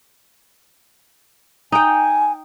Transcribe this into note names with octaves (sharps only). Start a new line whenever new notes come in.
D#4 G5 G#5